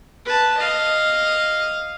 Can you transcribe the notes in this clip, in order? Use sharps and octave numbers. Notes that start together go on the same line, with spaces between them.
B4 A5
D#5 F5